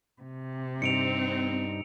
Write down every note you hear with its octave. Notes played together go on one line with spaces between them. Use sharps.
C3
G2 C4 D#4 C#7 D7 F7